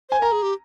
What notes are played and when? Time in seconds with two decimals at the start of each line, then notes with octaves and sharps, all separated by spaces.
0.09 C5 G#5
0.21 A#4 A#5
0.32 G#4
0.43 G4